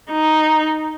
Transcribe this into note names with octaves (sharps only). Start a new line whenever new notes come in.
D#4